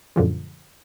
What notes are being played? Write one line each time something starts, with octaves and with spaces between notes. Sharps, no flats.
F#2 A#2 D3 F3 G#3